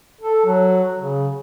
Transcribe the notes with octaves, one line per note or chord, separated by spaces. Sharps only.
A4
F#3
C#3